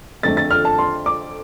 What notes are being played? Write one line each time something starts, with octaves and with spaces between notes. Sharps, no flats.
F2 D3 F3 A3 A6
A6
F6
A5
C6
D6